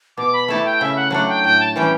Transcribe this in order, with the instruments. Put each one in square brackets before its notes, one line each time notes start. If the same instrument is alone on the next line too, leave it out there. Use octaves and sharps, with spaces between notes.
[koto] B2 [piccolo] D6
[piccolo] B5
[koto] A3 E4 G4 [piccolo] A5
[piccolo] G5
[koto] C#3 [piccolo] E5
[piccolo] F#5
[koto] F#3 A3 D4 [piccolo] F#5
[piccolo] G5
[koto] A2 [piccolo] G5
[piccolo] A5
[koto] E3 G3 C#4 [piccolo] G5